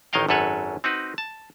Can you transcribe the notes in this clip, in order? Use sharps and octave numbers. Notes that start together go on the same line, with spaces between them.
A1 D#3 C#5 D#5 F5 G5
G#1 F#2 A4 B4 C#5
C4 D#4 F#4 B4
A5